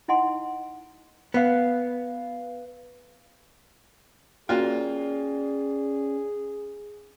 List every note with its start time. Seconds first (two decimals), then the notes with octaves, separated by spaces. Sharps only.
0.08 D#4 E4 D#5 F#5 G#5 C6
1.34 B3 B4 F5
4.49 A#3 C#4 F4 F#4 G#4 D5 G5